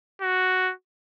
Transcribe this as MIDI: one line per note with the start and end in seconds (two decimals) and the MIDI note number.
0.21 0.73 66